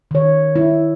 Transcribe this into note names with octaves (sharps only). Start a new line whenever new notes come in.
D#3 C#5
E4